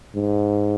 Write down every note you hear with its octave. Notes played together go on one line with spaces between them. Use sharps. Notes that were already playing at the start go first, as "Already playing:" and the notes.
G#2